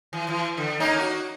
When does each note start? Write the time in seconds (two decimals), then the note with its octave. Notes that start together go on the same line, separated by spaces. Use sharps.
0.13 E3
0.28 E3
0.57 D3
0.80 A#3 C#4 D#4
0.99 F#4